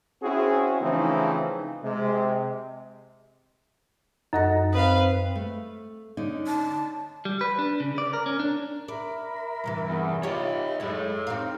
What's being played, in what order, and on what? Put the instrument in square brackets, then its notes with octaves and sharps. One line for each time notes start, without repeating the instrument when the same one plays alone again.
[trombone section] C4 C#4 E4 F#4 G#4
C#3 E3 F3 A3 C4 D#4
C3 G#3
[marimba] F#2 A4 A#6 [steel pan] D#4 D#5 F#5
[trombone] C4 [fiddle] B4 F5 [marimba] D#6
[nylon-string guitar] A3
D3 C#4 D#4
[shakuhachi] A5
[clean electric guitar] G3
B4
D4
C#3
D5
A#4
C#4
D4
[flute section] A#4 E5 B5 [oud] D5
[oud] G2 C3 E3
[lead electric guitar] E2
[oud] D#4 F4 G4 [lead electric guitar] C#5 D#5 [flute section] E5 B5
[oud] F#2 G#3 [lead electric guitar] A4 C#5
[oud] C4 D#4 F5 [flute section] G4 A#5